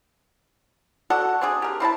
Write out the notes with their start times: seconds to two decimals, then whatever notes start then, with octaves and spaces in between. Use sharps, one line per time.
1.10 F#4 A4 D5 F#5
1.41 C4 D4 G#4
1.62 G4 A#4
1.80 C4 E4 D5 A5